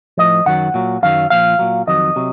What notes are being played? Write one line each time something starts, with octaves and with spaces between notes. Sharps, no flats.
A2 F3 D#5
F#2 D#3 F#3 F#5
A#2 F#3
F#2 D#3 F#3 F5
A#2 F3 F5
A#2 F#3
F2 D#3 F#3 D#5
C3 F#3